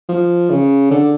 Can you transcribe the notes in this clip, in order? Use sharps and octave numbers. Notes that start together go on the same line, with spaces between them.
F3
C#3
D3